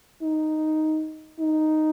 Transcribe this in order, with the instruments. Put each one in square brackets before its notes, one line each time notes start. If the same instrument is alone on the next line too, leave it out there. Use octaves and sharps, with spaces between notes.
[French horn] D#4
D#4